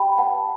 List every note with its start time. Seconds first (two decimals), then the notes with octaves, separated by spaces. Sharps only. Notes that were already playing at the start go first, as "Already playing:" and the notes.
Already playing: G4 D5 G5 B5
0.18 B4 F#5 A5